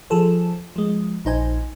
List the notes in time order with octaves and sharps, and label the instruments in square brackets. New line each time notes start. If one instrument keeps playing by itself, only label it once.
[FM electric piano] F3 G#4 A4 C5
F3 G#3
A#1 D#4 C5 G#5